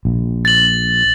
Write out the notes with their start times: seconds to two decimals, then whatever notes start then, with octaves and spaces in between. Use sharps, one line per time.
0.05 A#1
0.45 A6 F#7